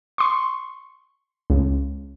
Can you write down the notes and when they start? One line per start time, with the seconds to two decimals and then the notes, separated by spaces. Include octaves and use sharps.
0.18 C6 C#6
1.50 C#2